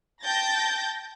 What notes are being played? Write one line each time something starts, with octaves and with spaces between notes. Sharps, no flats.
G5 A5 G6 A6 A#6